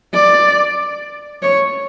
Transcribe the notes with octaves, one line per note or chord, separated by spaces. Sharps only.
D5
C#5